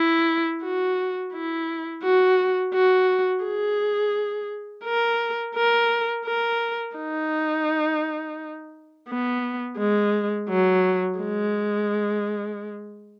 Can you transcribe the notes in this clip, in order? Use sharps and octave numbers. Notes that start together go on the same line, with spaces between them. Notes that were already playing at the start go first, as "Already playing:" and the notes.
Already playing: E4
F#4
E4
F#4
F#4
G#4
A#4
A#4
A#4
D#4
B3
G#3
F#3
G#3